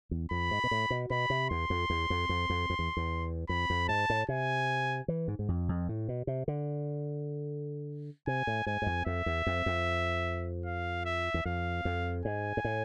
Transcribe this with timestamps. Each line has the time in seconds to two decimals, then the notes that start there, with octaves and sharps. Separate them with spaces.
0.11 E2
0.31 F2 B5
0.51 G#2
0.64 B2
0.71 A2
0.90 B2
1.10 B2 B5
1.30 C3
1.50 E2 C6
1.70 F2
1.90 E2
2.10 F2
2.29 F2
2.50 F2
2.70 F2
2.79 E2
2.97 E2
3.49 F2 B5
3.70 F2
3.89 G#2 A5
4.10 A2
4.29 C3 G#5
5.08 E3
5.28 G#2
5.39 G#2
5.48 F2
5.69 F2
5.89 A2
6.09 B2
6.27 C3
6.48 D3
8.27 C3 G#5
8.47 A2
8.66 G#2 G#5
8.82 G#2
8.86 F2
9.06 F2 E5
9.26 E2
9.47 F2
9.66 F2
10.66 F5
11.05 E5
11.34 E2
11.45 F2 F5
11.85 F2
12.25 G#2 G#5
12.57 G#2
12.64 A2